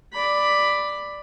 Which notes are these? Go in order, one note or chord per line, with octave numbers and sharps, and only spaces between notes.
D5 B5